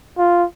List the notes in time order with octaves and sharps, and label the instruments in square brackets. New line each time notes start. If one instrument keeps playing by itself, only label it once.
[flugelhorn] F4